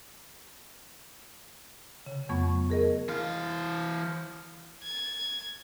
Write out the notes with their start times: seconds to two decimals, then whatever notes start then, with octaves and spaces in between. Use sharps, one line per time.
2.06 C#3
2.29 F2 F#3 A3 B3 C#6
2.70 G#4 A#4 D#5
3.08 E3 F5
4.82 G#6 A6